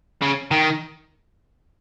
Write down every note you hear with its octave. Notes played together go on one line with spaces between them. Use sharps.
C#3
D#3